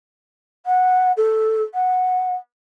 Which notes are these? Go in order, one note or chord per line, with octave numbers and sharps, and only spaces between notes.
F#5
A4
F#5